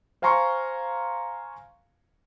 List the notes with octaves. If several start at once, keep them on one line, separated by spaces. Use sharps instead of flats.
C5 F5 G#5 A#5 C6 C#6